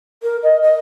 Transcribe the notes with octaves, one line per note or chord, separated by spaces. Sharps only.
A#4
D#5
D#5